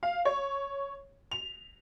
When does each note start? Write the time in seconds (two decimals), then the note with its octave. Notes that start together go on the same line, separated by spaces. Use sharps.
0.03 F5
0.25 C#5
1.31 F7